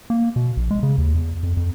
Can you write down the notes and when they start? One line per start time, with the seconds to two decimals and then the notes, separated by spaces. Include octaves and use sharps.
0.10 A#3
0.36 B2
0.57 A#1
0.71 G#3
0.83 C#3
0.98 D#2
1.15 E2
1.43 F2
1.57 F2